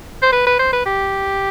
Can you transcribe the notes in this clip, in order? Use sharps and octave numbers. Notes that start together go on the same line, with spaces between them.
C5
B4
B4
C5
B4
G4